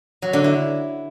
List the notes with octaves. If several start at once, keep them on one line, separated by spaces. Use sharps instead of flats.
F#3
D3
E4